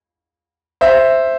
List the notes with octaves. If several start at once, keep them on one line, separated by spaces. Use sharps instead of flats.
C5 E5